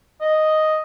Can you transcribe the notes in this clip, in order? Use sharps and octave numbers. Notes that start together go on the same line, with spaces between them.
D#5